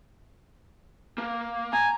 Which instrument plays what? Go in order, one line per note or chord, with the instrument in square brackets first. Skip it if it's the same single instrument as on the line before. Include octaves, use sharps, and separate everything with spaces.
[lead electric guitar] A#3
[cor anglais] G#5 [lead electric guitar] A#5